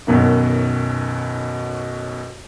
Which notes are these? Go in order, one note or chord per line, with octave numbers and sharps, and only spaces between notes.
B1 F#2 B2 D#3